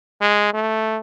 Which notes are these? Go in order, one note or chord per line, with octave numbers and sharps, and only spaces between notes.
G#3
A3